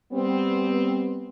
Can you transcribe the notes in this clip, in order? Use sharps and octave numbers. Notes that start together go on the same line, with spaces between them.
G3 B3 C4